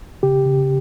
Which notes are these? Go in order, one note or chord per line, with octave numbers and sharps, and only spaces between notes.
C#3 G4
C#3